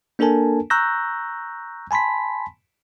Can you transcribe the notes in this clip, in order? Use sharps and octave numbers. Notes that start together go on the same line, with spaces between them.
A#3 D4 A4 A#4 G#5 A5
A#5 C#6 E6 F#6 G6 A#6
G#5 A5 B5 C6 B6